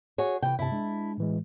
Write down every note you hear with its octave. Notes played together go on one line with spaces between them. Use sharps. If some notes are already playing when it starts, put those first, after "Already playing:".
F#4 G#4 C#5
C3 E3 G5
G2 C3 E4 A5
G#3 D4
A2 E3 G#3